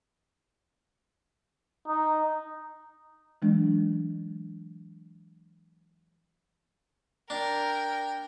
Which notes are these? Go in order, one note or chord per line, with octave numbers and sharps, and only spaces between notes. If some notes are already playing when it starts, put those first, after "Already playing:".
D#4
E3 F#3 G#3 D4
D4 A#4 G5